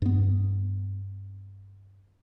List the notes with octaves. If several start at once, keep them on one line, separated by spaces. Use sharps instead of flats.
G2 B3